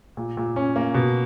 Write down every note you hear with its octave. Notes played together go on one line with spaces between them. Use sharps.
A#2
A#2
C#4
A#3
B2